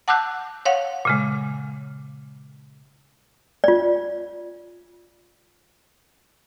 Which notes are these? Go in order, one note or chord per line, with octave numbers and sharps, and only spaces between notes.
F#5 A5 D6 E6 F#6 G6
C#5 F5 F#5
A#2 C#3 G#3
F4 D5